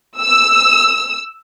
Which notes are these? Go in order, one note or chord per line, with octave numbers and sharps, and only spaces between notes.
E6